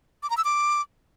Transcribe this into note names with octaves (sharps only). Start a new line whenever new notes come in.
D6
A#5
E6
D6